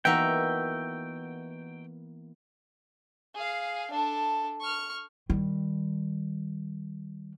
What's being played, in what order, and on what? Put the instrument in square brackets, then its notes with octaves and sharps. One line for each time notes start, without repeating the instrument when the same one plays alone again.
[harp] E3 A#3 B3 [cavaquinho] D#4 F#4 E5 [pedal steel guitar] G5
[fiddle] G#4 F5
D4 A4
C#6 F6
[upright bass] D#3 G3